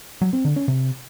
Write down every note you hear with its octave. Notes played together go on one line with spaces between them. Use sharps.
F#3
C4
D3
C#4
C3